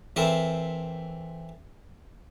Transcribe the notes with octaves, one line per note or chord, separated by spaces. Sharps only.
E3 C4 A4 A#4 E5